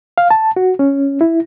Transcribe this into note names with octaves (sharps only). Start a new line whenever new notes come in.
F5
A5
F#4
C#4
E4